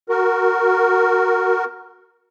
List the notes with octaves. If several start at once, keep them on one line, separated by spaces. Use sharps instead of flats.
F#4 A#4